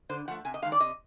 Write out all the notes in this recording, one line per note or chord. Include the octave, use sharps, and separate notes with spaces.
D3 C5
F3 A3 F#5
C3 G#5
D#5
D#3 G#3 F5
D5
C3 D#5